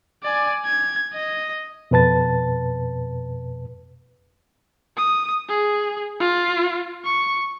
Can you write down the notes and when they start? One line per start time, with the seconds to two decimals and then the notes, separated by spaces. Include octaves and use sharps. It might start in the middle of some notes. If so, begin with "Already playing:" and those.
0.23 D5 G#5
0.66 G#6
1.14 D#5
1.91 F2 B2 B4 A5 A6
4.97 D#6
5.49 G#4
6.20 F4
7.05 C#6